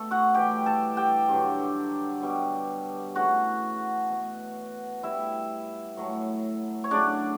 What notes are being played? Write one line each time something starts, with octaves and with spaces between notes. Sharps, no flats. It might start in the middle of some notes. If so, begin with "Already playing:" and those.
Already playing: B2 A3 A4
F#4 F#5
A2 E3 G3 G4 G5
A4 A5
G4 G5
G2 D3 F#3
B2 G3
C#3 E3 A3 F#4 F#5
B2 A3
A2 G3 E4 E5
A2 F#3 A3
C#5
C#3 F#3 A3 D4 D5